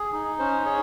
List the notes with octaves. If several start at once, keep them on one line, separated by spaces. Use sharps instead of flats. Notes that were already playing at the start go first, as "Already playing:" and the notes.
Already playing: G#4
D#4
C#4 C5
G#4 C#5